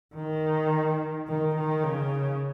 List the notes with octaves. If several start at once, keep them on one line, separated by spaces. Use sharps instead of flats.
D#3
D#3
D#3
C#3